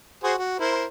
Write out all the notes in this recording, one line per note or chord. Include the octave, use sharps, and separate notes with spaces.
F#4 G#4 C5
F#4
E4 A#4 C5